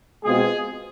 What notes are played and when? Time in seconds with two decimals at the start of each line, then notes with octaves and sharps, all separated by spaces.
0.25 B2 G#3 C4 F4 G#4